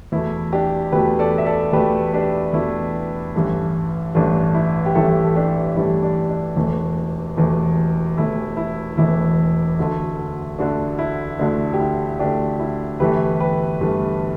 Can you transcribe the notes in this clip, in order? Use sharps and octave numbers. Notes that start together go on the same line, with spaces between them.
E2 B2 A3 E4
D4 G4
E2 B2 A3 G4 B4
A4 D5
E5
A4 D5
E2 B2 A3 G4 B4
D4 G4
E2 B2 A3 E4
A1 G2 E3 A3
A1 G2 E3 A3 D4
E4
G4
A1 G2 E3 A3 E4 A4
A4
D4 G4
A1 G2 E3 A3 E4
D4
D4
E1 E2 E3 A3
E1 E2 E3 A3
E1 E2 E3 A3 E4
E4
E1 E2 E3 A3 E4
D2 D3 A3
D2 D3 A3 D4
E4
D2 D3 A3 D4
G4
E4
D2 D3 A3 D4 G4
E4
G1 G2 E3 A3 G4 B4
G4 B4
G1 G2 E3 A3